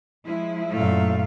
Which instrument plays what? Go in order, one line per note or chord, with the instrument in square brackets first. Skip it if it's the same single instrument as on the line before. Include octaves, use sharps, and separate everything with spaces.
[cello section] F3 G#3 E4
[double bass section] F#2 A#2 [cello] A3 F5